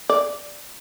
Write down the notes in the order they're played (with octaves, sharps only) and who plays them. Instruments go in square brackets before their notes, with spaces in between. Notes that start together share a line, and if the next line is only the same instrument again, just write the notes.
[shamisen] D5